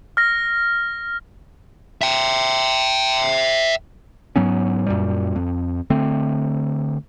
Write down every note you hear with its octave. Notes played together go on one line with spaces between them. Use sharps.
F6 A#6
E5 G5
G#2 F#3 B3 C#4
F#2 A#2 G3
F2
D3 A3 C4